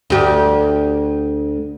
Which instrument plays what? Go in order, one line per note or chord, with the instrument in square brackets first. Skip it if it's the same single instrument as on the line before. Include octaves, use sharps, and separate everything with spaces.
[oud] D2 G4